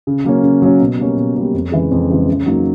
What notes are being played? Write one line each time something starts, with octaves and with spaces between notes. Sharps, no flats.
C#3
F#3 A#3 C#4
C#3
F#3 A#3 C#4
B2
G3 A#3 C#4
B2
G3 A#3 C#4
F2
C#3 E3 G#3
F2
C#3 E3 G#3
C#3
F#3 A#3 D#4